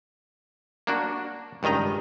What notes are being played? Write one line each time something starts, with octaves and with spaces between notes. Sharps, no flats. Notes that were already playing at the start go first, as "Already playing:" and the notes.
A#3 D4 F#4
C#2 G2 D#3 D#5 A#5